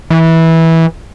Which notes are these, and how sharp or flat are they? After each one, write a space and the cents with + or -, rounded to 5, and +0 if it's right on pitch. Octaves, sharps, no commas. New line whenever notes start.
E3 -15